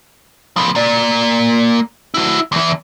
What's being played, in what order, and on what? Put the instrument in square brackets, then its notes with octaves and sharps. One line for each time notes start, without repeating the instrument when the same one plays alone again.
[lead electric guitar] F3 B3
A#3 D5
E4 F#4
E2 E3